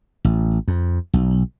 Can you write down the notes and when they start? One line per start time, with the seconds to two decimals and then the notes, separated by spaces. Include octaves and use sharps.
0.25 A1
0.68 F2
1.14 B1